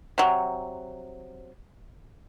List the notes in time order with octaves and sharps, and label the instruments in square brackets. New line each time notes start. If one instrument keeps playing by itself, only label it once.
[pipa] C3 F#3